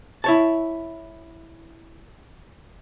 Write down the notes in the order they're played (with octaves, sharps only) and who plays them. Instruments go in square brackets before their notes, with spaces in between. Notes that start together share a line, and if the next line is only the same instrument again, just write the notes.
[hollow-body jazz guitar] E4 C#5 A5